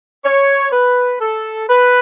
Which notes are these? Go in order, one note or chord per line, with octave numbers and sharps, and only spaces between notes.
C#5
B4
A4
B4